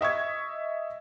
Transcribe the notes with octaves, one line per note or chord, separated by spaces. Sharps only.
D#5 E5 C#6 G#6